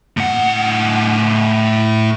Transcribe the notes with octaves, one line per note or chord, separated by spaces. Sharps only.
A2 F#5